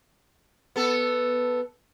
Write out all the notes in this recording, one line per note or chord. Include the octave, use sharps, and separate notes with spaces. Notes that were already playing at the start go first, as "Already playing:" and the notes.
B3 A4